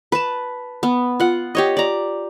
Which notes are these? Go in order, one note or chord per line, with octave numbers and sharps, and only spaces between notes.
B4 A5
B3
F4 F#5
G4 C#5 D#5
D5 A#5